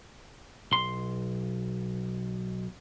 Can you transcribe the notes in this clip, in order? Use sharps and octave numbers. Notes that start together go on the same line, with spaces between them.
B1 C6